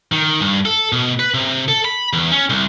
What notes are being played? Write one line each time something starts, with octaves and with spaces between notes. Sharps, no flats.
D#3
G2
A4
B2
B4
C3
A4
B5
E2
C#4
C2